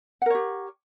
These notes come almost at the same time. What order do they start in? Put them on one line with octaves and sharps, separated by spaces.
F#5 A#4 C#5 G4